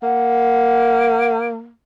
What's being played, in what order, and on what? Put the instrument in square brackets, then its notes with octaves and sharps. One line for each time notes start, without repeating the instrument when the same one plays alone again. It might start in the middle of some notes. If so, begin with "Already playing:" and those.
[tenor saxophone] A#3 [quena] F#5